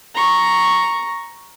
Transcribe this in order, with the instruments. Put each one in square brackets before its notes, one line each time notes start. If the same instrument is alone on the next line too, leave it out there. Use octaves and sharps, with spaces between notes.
[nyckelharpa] A#5 C#6